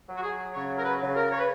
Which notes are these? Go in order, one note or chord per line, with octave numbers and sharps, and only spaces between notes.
F#3
F#4
G#4
C#3 C#5
A#4
B4
C#3
A#4
C#5
B4